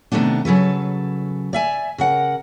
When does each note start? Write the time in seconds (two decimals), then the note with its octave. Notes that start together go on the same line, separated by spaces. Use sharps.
0.12 C3 D#3 F3 A3 B3 D4
0.45 C#3 F#3 A4 B4
1.53 D5 E5 G#5
1.98 C#3 A#4 F#5